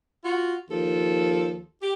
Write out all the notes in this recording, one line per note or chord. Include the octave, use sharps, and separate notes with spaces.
F4 F#4
D#2 F3 A4
G4